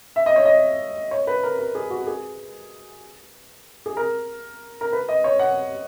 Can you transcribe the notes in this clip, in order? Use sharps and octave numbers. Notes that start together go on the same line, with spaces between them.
E5
D#5
C#5
D#5
C#5
B4
A#4
A#4
G#4
F#4
G#4
G#4
A#4
A#4
B4
D#5
C#5
F#5